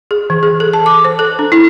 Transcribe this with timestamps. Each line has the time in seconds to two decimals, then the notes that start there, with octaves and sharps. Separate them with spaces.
0.11 G#4
0.30 E3
0.43 G#4
0.60 A4
0.73 A5
0.86 D6
1.05 C5
1.19 A4
1.39 D4
1.52 E4